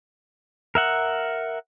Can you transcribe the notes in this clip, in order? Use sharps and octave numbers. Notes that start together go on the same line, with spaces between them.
A#4 E5 F#5